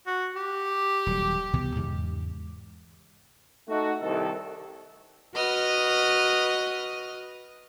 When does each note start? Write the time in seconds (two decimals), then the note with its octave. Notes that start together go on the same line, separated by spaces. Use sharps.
0.06 F#4
0.36 G4
1.06 D#1 F#3 G3
1.53 C2 B2 E3
1.75 E2 G#2 C#3
3.68 A3 D#4 F#4
4.00 C2 D#3 A4
5.34 F#4 B4 D#5 F6